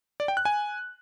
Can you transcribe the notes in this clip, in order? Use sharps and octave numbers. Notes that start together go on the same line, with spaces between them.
D5
G5
F#6
G#5